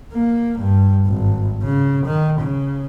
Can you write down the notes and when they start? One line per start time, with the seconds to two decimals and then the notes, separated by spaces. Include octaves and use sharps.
0.13 A#3
0.59 G2
1.06 G#1
1.62 C#3
2.06 D#3
2.40 C#3